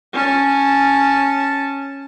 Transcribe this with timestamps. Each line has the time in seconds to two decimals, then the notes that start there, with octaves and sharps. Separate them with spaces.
0.13 C#4 A5